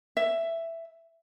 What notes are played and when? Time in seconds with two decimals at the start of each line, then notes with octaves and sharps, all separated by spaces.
0.17 E5